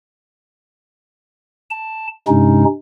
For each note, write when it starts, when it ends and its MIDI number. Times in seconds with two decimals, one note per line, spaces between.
1.70 2.07 81
2.28 2.65 43
2.28 2.65 48
2.28 2.65 56
2.28 2.65 61
2.28 2.65 63